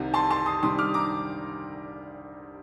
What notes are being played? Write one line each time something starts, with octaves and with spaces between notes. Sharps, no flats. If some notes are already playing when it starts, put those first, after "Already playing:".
Already playing: C2 C3 D#3
A5 C6
A5 C6
C6 D#6
C3 D#3 G3 D4 C6 D#6
D6 F6
A#5 D6